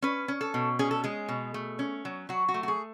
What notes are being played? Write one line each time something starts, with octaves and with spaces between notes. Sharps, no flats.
C#4 B4
C#4
A4
B2
C#4 G#4
A4
G#3 G#4
B2
A3
C#4
F#3
F#3 F#4
F#4
A3
F#4
G#4